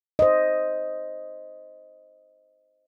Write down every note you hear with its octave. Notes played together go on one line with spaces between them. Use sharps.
C5 D#5